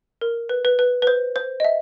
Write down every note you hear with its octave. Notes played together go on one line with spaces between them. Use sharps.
A#4
B4
B4
B4
B4
C5
C5
D#5
E5